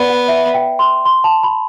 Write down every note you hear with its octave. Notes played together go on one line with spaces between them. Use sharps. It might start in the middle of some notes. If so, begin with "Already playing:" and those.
Already playing: B3 D5
F#5
E5
G5
C6
C6
A5
B5